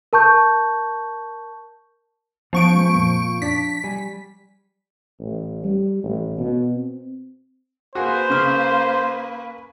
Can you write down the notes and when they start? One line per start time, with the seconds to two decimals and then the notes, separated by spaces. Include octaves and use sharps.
0.13 A#4 A5 C#6 G6
2.53 F3 B3 C#4 F#5 C#6 D7
2.76 G#3 B3
2.94 F2 A#2 A#3
3.42 D4 D5 A5 B6
3.84 G3 G#5
5.20 A1
5.64 G3
6.03 A1
6.38 B2
6.76 C4
7.95 A#3 F#4 G#4 B4 C5
8.30 C#3 F6